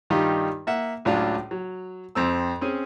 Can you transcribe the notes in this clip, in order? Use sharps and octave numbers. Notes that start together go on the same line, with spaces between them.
G2 D#3 G3 D#4 F4 G4
A#3 E5 F#5
C#2 A2 F#3 D4 F4
F#3
F2 C4 E6
C4 C#4 G#4